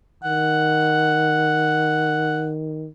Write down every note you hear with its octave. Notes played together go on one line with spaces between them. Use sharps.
D#3 F#5